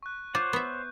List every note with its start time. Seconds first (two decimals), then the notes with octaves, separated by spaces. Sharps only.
0.03 C#6 F#6
0.35 F4 C5 C#5 F#5 D6 G6
0.53 B3 E5